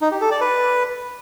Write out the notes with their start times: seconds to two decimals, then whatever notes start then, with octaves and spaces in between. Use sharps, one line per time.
0.02 D#4
0.11 G4
0.21 A4
0.31 D5
0.41 B4